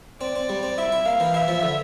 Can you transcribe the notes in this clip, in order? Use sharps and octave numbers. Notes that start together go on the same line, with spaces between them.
C4 D5
C4
G3
C4
E4 E5
E4
A#3 F5
E3
E4 E5
F3
D3